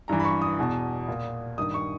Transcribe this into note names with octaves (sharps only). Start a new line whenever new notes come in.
G2 E3 A#5
B5
C#6
D#6
E2 B2
A#2
G2 D#3 D#6
C#6